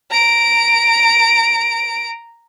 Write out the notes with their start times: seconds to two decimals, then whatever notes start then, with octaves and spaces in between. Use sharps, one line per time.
0.10 A#5 D7